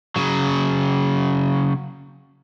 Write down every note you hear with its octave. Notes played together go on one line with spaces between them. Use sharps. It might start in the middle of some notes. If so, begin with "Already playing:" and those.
C#3 F#3